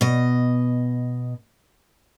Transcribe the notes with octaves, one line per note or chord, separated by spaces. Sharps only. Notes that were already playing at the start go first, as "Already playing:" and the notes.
B2 D#5